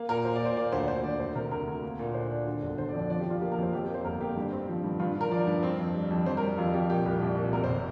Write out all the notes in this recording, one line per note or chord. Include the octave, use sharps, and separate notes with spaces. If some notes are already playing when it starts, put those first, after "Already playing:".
Already playing: A#3
A#2 A#4
A#2 C5
D5
A#2
C5
A#3 D5
D2 C5
D2 C5
D2 D5
D2 C5
C3 A#4
D2 A#4
D2
A#3
A#2
D4 C5
D4
D3
G1
D3 C5
D5
F2
D5
F3 D5
G4
F3
F4
A#3 G4
A#4
F2
C5
F2 G4
G4
A#3
C5
G1 A#4
A#3 G4
G2
C4
F3
G2
G2 F4
G2
A#4
F3 D5
G2
C4
F2
G3
F2
F2 C5
A#4
G3
F2 F4
F2 G4
A#2 G4
C2
C2
A#2
F1 A#4
C5
C3